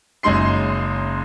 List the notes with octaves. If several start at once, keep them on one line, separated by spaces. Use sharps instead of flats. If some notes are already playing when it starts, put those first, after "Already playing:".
F#1 F#2 G#3 D#4 C6 C7